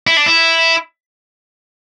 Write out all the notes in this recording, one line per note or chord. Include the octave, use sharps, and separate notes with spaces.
E4
D4
E4